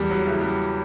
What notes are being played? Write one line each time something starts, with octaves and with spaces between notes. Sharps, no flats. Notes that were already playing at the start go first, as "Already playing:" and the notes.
Already playing: E2 G3
F#3
C#3 E3
G3